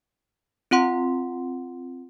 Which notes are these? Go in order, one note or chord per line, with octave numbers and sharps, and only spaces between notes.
C4 F4 F#5 C6